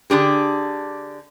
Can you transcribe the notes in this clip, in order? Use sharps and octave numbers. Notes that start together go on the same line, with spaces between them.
D3 D4 G4 G#4